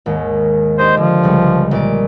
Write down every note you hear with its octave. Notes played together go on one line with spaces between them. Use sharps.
G#1 D#2
D4 G4 C5 D#5
D3 F3
C#2 C#3 G3
A#1 D5 D7